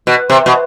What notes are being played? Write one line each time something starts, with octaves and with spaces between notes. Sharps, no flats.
B2
C3
B2